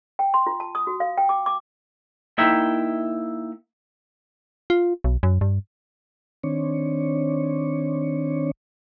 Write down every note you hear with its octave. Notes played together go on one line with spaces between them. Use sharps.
G5
C6
F4
A5
D#6
F#4
F5
G5
D6
D6
A#3 D#4 E4 E5 G5
F4
B1
F#2
G2
D#3 C4 D4 C#5